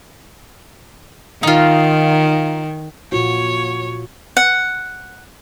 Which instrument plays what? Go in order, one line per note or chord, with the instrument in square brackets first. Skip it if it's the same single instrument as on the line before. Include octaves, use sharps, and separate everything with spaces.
[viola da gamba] D#3 [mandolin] D#4 F4
[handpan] A#2 F4 F#4 [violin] C#5
[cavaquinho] F#5